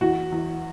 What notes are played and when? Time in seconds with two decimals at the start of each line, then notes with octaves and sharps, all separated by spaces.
0.01 E2 F#4
0.32 E2